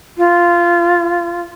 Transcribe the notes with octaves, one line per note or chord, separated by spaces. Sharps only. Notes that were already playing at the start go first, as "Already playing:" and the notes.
F4